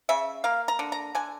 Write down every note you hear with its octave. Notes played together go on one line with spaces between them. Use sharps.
C#3 E5
A#3 F5
A#5
D3
A#5
D3 G#5